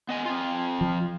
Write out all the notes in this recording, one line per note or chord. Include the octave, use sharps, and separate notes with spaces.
B3 D#5 G#5
C4 F4
F3